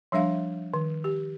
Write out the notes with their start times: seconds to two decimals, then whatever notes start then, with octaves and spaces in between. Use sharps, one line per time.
0.12 F3 G3 D4 E5 F5
0.74 D#3
1.04 G4